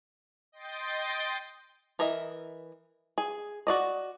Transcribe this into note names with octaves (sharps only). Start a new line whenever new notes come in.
D#5 G5 C6 G6 A6
E3 A#4 D#5 E5
G#4
F#4 D5 D#5